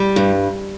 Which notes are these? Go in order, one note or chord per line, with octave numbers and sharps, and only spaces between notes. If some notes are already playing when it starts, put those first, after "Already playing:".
Already playing: G3
G2